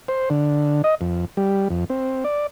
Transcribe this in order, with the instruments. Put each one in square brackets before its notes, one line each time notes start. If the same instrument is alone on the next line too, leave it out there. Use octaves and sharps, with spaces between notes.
[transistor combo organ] C5
D3
D#5
F2
G3
F2
C4
D5